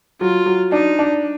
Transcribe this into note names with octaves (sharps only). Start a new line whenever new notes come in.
F#3 F4
F#3
D4 D#4
D4